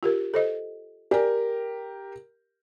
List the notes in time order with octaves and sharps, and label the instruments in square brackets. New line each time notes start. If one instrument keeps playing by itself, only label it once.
[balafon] F4 G4 A#4
A4 C5 D#5
[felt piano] G4 A#4 [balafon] D5 G#5